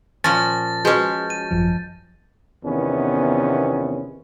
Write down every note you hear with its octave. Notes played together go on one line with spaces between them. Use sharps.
A#2 F3 C#4 A5 A6 A#6
G#3 C#4 F#4 G#4 B4 G6
D#7
G#1 F#2 F3
E2 C3 D#3 B3 C#4